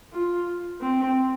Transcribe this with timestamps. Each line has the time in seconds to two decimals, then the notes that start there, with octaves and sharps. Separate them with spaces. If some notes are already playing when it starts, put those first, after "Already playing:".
0.13 F4
0.81 C4